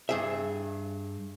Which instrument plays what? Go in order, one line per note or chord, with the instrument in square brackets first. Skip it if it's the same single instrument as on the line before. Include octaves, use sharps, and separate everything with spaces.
[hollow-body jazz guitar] G2 G#4 E5